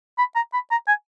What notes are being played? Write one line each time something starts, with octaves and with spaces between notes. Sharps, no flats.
B5
A#5
B5
A#5
G#5